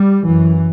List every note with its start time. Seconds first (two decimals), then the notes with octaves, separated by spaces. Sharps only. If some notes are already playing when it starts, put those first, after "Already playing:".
Already playing: G3
0.25 F#2 E3